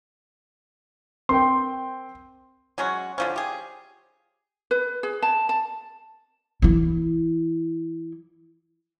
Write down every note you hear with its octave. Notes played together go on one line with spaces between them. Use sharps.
C4 A#4 G5 C6
F#3 G#3 C#4 F#4
D3 F3 C#4
G4 G#4
B4
G#4
A5
A5
E3 E4